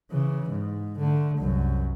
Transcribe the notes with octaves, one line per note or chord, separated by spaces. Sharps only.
C#3 E3
G#2
D3 A3
C2 F#2